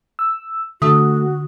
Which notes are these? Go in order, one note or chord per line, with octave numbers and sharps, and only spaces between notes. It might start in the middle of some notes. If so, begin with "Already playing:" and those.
E6
D3 A3 F#4 D#6